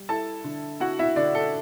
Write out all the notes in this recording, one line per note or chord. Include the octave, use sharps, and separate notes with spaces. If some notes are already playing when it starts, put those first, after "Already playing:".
Already playing: G3
E4 A4 A5
D3
E4 F#4 F#5
E4 E5
D3 D4 D5
A4